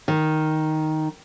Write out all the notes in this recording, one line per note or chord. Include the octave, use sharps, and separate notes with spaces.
D#3